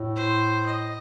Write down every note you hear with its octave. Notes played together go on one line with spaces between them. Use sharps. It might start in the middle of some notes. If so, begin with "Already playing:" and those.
Already playing: A2
C5
D#5